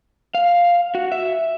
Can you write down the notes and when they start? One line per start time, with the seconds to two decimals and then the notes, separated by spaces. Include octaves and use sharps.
0.35 F5
0.95 F#4
1.12 E5